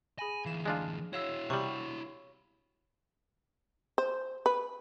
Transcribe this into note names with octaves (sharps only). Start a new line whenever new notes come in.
G#4 G#5 B5 A#6
D2 E3 F5 E7
G#3 D4 F4
E4 F#4 C#5 F5 E6
C3 G3 B5 C#6
C5
B4